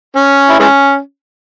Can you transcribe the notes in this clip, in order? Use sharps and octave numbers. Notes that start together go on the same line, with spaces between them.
C#4
E4
E3 G#3 C#4